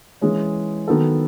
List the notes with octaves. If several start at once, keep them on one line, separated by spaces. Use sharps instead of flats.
E3 G#3 C#4
D#3 F#3 B3 F#4 A4